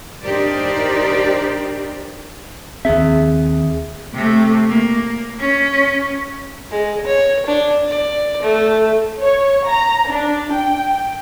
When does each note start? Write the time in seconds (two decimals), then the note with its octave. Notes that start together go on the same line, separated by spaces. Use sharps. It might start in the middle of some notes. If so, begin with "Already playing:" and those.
0.23 D4 D#4 G4 A#4 C5 D5
2.85 D#2 C4 G#4 E5
4.14 C3 A3
4.69 A#3
5.39 C#4
6.71 G#3
7.07 C#5
7.47 D4
7.88 D5
8.43 A3
9.20 C#5
9.67 A#5
10.09 D4
10.52 G5